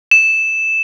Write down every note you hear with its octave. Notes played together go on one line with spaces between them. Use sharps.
E7